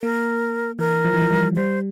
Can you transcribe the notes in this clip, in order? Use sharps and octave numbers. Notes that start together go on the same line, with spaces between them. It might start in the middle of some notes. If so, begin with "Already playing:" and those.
A#3 A#4
E3 A#4
F3
E3
F3
G3
G3 C5